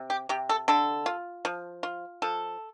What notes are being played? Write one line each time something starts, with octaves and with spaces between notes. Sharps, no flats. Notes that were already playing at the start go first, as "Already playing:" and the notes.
Already playing: C3
G4
C3 G4
A4
D3 A4
F4
F3
F4
F3 A4